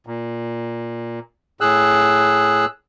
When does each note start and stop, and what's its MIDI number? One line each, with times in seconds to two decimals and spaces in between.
0.07 1.19 46
1.61 2.65 45
1.61 2.65 68
1.61 2.65 88
1.61 2.65 90